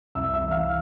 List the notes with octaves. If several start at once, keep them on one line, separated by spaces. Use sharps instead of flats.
C2 E5 E6
E5 E6
E3
F5 F6